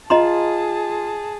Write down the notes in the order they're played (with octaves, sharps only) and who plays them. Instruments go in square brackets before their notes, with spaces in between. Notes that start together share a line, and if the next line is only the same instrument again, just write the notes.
[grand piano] F4 [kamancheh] G#4 A5 [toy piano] D#5 A#5 C6